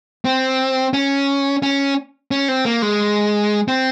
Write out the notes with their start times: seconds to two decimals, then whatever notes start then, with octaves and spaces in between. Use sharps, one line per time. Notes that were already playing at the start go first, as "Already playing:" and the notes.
0.25 C4
0.93 C#4
1.63 C#4
2.31 C#4
2.48 C4
2.65 A#3
2.82 G#3
3.68 C4